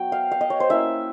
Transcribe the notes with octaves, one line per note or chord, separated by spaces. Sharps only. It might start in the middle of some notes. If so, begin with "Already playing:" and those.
Already playing: F#3 B3 G5
F5
F5
D#5
C#5
C5
A#3 C#4 E4 E5